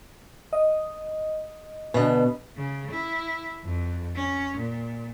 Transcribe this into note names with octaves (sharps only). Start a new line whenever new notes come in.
D#5
B2 D3 B4 D#5
C#3
E4
F2
C#4
A#2